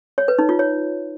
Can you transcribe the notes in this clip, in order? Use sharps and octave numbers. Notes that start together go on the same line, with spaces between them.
C#5
B4
D#4
F4
C#5